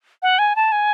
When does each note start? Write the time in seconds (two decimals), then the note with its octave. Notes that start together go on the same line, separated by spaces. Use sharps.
0.23 F#5
0.39 G#5
0.56 A5
0.72 G#5